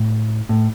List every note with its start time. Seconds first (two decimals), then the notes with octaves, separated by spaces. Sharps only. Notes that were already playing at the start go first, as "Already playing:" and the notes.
Already playing: A2
0.49 A2